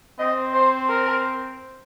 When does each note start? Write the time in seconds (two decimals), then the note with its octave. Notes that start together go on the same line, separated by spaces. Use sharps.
0.19 C4 D#5
0.54 C5
0.89 A#4